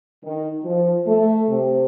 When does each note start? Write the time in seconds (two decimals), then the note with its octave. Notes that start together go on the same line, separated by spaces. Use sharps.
0.23 D#3
0.64 F3
1.06 A3
1.49 C3